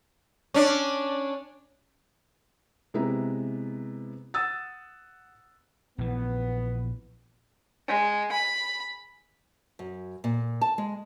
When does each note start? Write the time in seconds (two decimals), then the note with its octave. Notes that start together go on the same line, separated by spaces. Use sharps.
0.54 C#4 D4
2.94 C3 G#3 B3 E4 B4 A#5
4.34 F#5 D#6 E6 A6
5.98 A#1 E3 B3
7.87 G#3
8.32 B5
9.79 F#2
10.24 A#2
10.61 A5
10.78 G#3